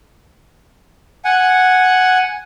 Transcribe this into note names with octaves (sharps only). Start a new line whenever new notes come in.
F#5 G#5